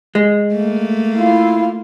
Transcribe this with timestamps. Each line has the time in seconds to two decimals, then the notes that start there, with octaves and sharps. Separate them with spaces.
0.15 G#3
0.52 A3 A#3
1.14 E4 F4 F5